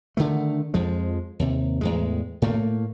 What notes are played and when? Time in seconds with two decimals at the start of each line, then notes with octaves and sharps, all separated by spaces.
0.17 D3 D#3 A3
0.74 F2 F3 G#3
1.39 D#2 C3
1.81 E2 A2 G#3
2.42 A2 A3 A#3